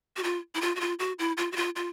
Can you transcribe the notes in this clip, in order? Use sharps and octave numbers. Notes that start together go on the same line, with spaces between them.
F#4
F4
E4
F4
F#4
F4
F#4
E4
F4
F#4
F4
F4